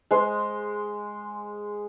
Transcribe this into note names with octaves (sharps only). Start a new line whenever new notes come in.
G#3 C5